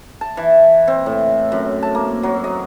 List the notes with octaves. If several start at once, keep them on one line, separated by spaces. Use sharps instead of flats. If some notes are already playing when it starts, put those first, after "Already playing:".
A5
E3
C4
A2
F#2
A5
A#3
F#3
D#5